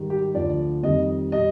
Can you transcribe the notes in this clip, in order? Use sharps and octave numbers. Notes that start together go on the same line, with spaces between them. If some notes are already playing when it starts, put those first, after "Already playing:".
Already playing: G#2 D#3 G3
G4
D2 D3 F3 D5
F2 D#3 G3 D#5
B2 G3 D#5